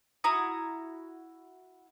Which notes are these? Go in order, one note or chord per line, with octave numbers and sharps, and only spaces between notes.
E4 F#4 A#5 D#6